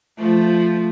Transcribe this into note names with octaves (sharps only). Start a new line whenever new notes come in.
F3 A3